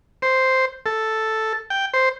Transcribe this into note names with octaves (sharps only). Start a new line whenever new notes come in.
C5
A4
G5
C5